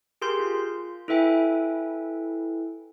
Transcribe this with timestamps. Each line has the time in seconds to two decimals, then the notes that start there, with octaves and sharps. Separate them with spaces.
0.21 G4 G#4 A#4 C6 G6
0.39 F4
1.08 E4 A4 B4 E5 G5 G#5